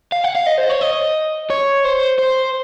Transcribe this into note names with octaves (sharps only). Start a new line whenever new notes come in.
F5
F#5
F5
D#5
C5
C#5
D#5
C#5
C5
C5